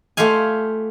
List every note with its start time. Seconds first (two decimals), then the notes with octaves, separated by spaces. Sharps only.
0.17 A3 F4 G4 F5 G#5